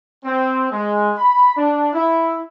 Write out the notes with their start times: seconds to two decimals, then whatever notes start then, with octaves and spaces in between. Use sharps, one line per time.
0.25 C4
0.71 G#3
1.17 B5
1.57 D4
1.93 E4